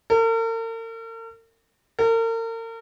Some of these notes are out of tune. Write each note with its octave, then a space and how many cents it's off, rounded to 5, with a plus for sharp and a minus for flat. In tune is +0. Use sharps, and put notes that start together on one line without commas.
A#4 -45
A#4 -40